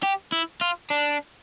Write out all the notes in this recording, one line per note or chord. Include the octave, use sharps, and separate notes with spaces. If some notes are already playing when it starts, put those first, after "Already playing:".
G4
E4
F4
D4